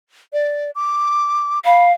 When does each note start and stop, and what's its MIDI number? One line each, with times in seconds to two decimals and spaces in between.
0.33 0.71 74
0.75 1.60 86
1.65 1.92 77
1.65 1.85 83